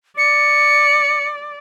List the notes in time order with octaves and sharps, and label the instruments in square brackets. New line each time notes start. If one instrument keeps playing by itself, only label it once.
[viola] D5 [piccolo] C#7